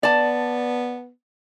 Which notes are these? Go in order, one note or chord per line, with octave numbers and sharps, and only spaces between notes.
B3 D5 A5